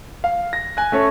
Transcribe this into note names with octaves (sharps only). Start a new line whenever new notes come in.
F5
A#6
G#5 F#6
A3 C#4 A4 C#5